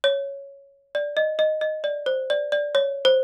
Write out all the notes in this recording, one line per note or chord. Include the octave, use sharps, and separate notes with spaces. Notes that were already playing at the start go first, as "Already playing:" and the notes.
C#5
D5
D#5
D#5
D#5
D5
C5
D5
D5
C#5
C5